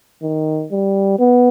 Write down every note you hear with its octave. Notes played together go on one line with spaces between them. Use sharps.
D#3
G3
B3